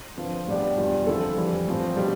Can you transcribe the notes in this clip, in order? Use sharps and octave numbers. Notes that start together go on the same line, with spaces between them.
D3 F3 C4 F4 B4
A2 G3 B3 D4 G4
E2 B2 G3 D4 F4
D3 F3 C4 E4 A4
F2 E3 G3
A2 F3 C4
B2 G3 D4